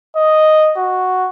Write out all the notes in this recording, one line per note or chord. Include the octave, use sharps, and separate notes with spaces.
D#5
F#4